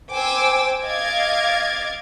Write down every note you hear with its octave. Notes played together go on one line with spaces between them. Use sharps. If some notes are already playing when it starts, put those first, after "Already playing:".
C5 G5 G#5 D6 E6
D#5 F5 D6 G#6 A6